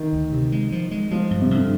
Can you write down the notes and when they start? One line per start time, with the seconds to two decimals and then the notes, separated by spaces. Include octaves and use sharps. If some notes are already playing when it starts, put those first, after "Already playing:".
Already playing: D#3
0.13 D2
0.32 C3
0.52 G#3
0.72 F3
0.91 G#3
1.11 F3 G#3
1.31 G2
1.41 C3
1.51 G2
1.56 D3